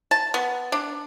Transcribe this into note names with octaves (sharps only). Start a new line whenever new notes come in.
A5
B3
D4